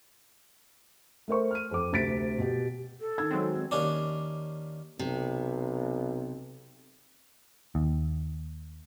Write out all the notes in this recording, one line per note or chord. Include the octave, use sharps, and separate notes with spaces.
A3 A#4 C5 C#6
F6 D#7
F2 A4 D6
D2 C3 A6 B6 D7
B2 G4
A4
D#3 E6 G#6
F#3 G#3 C4
D#2 C#4 D4
B1 C3
D#2